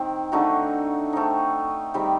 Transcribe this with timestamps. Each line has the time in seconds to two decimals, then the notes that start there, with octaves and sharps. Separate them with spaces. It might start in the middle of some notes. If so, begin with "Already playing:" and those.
Already playing: D#3 C4
0.32 D3 A3 D#4 F#4
1.13 A3 C4 D#4
1.94 D#3 G3 C4 G4